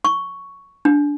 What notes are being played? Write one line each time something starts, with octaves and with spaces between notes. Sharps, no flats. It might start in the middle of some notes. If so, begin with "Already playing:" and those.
C#6
D4